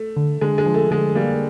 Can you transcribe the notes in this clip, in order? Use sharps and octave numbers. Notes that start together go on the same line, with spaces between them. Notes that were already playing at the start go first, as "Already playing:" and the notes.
Already playing: A3
D3
D3 G#3
G#3
F3
A3
D3 G#3
G3 A#3